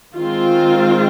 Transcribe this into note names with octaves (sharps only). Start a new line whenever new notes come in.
D#3 G#3 C4 F4